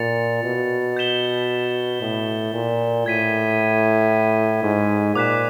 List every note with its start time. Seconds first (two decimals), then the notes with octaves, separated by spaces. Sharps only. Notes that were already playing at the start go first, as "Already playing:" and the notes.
Already playing: A#2 A6 C#7 F7
0.44 B2
0.97 G6 B6 E7 G7
2.02 A2
2.53 A#2
3.06 A2 G#6 B6 D#7
4.63 G#2
5.15 A#2 D6 F#6 B6 E7